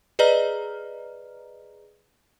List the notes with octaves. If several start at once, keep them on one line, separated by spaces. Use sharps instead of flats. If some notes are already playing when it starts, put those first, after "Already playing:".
G#4 B4 D5 D#5 A#5 F6